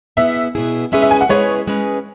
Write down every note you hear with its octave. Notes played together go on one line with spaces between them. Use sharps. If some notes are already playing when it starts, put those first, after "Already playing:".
B2 B3 E4 G#4 E5
B2 B3 E4 G#4
G#3 C#4 E4 G#4 B4 E5
E5
G#5
F#5
G#3 C#4 E4 G#4 B4 C#5
G#3 C#4 G#4 B4